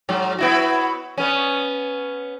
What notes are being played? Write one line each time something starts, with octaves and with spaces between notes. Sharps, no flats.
G#2 F#3
B3 E4 F#4
B3 C#4